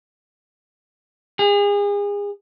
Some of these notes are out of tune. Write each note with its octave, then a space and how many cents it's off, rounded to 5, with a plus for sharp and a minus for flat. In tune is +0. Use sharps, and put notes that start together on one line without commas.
G#4 -35